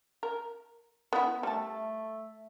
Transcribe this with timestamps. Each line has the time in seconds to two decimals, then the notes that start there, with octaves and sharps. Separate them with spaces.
0.23 A#4
1.13 B3 C#4 E4
1.43 G3 A3 A5